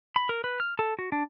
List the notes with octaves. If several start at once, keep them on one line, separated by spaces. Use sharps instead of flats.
B5
A#4
B4
F6
A4
F#4
D4